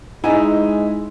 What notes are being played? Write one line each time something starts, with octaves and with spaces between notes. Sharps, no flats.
G#3 D#4 E4 G#5